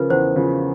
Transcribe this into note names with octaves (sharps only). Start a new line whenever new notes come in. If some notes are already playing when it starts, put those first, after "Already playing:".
Already playing: C#3 F3 A#4 B4
E2 C5
C#3 F3